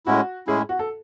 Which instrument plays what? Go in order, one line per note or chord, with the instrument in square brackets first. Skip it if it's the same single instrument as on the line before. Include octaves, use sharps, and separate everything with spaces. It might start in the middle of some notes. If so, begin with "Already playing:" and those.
[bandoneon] A2 G#3 C#4 E4 [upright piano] F#4
[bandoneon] A2 G#3 C#4 E4 [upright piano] G#4
[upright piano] F#4
A4